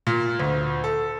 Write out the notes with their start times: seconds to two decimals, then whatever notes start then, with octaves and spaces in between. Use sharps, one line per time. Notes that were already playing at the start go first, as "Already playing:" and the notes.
0.07 A#2
0.39 D2
0.84 A4